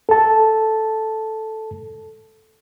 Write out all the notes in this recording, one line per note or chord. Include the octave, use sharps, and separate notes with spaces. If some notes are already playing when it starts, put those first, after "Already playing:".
A4 A5